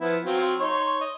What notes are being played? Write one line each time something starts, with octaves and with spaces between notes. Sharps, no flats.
F3 B3 E4
F#3 C4 F4
D#4 C#5 C6
D#5